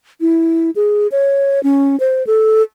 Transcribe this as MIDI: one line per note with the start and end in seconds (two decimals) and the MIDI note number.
0.21 0.70 64
0.76 1.08 68
1.12 1.62 73
1.63 1.98 61
2.00 2.25 72
2.27 2.62 69